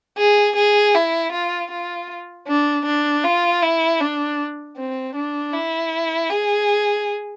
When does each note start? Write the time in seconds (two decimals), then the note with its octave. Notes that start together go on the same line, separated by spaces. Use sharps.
0.18 G#4
0.56 G#4
0.94 E4
1.33 F4
1.71 F4
2.48 D4
2.86 D4
3.24 F4
3.62 E4
4.01 D4
4.77 C4
5.16 D4
5.54 E4
6.30 G#4